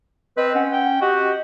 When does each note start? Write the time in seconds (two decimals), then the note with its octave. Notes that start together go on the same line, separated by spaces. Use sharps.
0.37 C4 B4 D#5
0.55 C#4 F#5
0.72 G5
1.01 F#4 G4 D#5